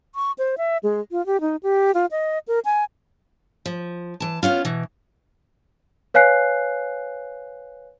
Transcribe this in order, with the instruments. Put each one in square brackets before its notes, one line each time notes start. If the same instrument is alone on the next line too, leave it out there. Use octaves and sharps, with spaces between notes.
[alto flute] C#6
C5
E5
G#3
F4
G4
D#4
G4
F4
D#5
A#4
G#5
[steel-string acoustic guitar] F3
E3 A5
B3 C#4 F4
B2 E3
[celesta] B4 C#5 F5 G#5 F#6 C7